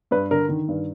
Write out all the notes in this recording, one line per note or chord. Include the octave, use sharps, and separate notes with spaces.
G2 B4
D3 A#4
D#3
G2